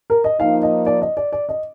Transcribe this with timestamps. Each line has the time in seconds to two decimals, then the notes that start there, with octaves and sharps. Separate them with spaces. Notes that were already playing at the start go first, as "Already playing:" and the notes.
0.10 A#4
0.24 D#5
0.40 F3 A#3 D#4 F5
0.63 D#5
0.86 D5
1.02 D#5
1.17 D5
1.32 D5
1.49 D#5